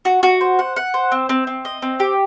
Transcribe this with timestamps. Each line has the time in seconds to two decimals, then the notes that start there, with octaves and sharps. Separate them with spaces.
0.05 F#4
0.23 F#4
0.41 C5
0.59 F#5
0.76 F#5
0.94 C5
1.12 C4
1.29 C4
1.47 C4
1.65 D#5
1.82 C4
2.00 G4